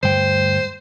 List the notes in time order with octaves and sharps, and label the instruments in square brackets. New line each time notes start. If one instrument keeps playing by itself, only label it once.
[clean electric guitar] D2 G2 G5 [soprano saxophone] C5